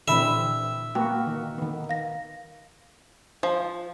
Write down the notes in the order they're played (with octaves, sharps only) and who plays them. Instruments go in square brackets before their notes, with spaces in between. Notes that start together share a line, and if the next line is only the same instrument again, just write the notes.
[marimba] A#2 B5 [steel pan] D3 E3 C4 [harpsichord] E5
[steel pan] A#3 B3 F#4 [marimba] G5
[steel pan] D#3
D#3 B3
[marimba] F5 A#6
[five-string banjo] F3